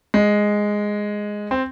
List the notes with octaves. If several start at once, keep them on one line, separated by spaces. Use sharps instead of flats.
G#3
C4